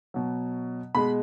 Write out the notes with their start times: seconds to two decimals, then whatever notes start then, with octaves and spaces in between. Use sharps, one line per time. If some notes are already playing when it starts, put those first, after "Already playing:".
0.14 B2 F#3
0.95 B2 G#3 B5